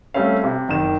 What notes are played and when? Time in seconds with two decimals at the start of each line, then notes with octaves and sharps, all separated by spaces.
0.14 G3 A3 C4 C#4 F5
0.44 C3
0.68 F#1 D#3 E7